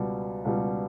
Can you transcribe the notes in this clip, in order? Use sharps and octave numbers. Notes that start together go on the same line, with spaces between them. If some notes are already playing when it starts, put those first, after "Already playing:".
Already playing: C#2 B2 G3
C#2 B2 G3